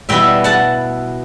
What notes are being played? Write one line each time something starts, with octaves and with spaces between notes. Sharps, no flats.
B2 G3 B3 E4 E5 G5
F#5 A5